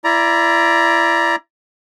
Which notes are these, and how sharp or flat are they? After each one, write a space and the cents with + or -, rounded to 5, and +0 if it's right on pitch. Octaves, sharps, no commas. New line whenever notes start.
E4 +30 D5 +0 A#5 +20